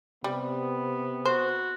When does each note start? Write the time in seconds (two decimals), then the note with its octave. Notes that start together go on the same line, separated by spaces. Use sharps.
0.24 C3 G3 B3
1.25 F#4 C5